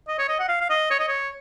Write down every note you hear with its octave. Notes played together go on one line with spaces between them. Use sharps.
D#5
C#5
D#5
F#5
F5
F5
D#5
C#5
D#5
C#5